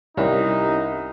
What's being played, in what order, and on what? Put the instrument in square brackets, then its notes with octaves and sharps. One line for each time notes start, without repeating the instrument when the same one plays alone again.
[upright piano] C2 [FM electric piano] G3 C#4 [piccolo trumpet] D#4 [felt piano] E4 A#4